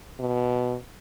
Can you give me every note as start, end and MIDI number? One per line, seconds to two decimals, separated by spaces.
0.20 0.76 47